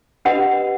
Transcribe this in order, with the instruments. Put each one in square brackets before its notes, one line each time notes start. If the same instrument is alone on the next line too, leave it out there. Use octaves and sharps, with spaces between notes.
[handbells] D4 G4 B4 D#5 [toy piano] F#5